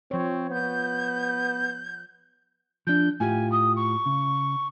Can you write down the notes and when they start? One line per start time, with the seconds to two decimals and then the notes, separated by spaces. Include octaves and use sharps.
0.11 F3 C4 C#5
0.51 B3 G6
2.87 F3 D4 G6
3.20 A2 F4 G4 G#5
3.52 D#6
3.76 C#6
4.06 C#3